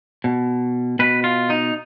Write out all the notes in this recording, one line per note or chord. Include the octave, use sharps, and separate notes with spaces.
B2
B2 B4
F4
D#4